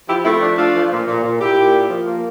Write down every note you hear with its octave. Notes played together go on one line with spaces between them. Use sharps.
F3 E4 G4
A3 C4 E4
F3 D4
A3 D4 F4
F3
A#2
A#2
A#2
A#2 E4 G4
A#2
A#3
F3
A#3